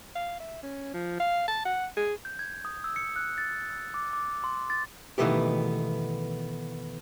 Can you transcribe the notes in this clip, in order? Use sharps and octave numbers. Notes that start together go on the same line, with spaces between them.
F5
E5
C#4
F3
F5
A5
F#5
G#4
G6
G#6
D#6
E6
C#7
F#6
A6
E6
D6
D6
C6
A6
B2 D#3 E3 A3 B3 G4